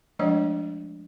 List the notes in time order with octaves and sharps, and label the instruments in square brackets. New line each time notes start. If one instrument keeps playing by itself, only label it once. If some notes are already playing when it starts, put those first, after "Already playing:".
[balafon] F3 G#3 A3 D4 C#5 D#5